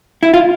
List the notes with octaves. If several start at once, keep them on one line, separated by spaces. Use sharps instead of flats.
E4
F4